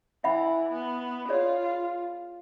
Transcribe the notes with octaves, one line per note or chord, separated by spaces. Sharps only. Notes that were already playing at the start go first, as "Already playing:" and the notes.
E3 E5 F#5 B5
B3
F4 G#4 C#5 D5